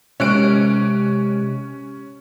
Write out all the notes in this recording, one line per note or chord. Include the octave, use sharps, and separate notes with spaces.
C3 G#3 C#4 G4 F#6 D7